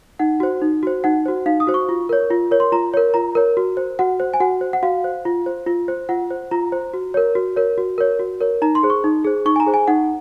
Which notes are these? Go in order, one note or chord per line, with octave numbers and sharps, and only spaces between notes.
D#4 F#5
F#4 C5
D#4
F#4 C5
D#4 F#5
F#4 C5
D#4 F5
D#6
F#4 C5
C#6
F4
A#4 C#5
F4
A#4 C#5
C6
F4 A#5
A#4 C#5
F4 A#5
A#4 C#5
F#4
C5
F#4 F#5
C5
G#5
F#4 F#5
C5
F#5
F#4 F5
C5
F4
C5
F4
C5
F4 F#5
C5
F4 A#5
C5
F#4
A#4 C#5
F#4
A#4 C#5
F#4
A#4 C#5
F#4
A#4 C#5
D#4 A#5
C6
G#4 C5
C#6
D#4
G#4 C5
D#4 C#6
G#5
A#5
G#4 C5
G#5
D#4 F#5